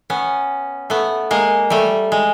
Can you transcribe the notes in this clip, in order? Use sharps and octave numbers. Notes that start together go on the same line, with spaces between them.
B3 C#4
A3 B3
G#3 A#3
G3 A3
G#3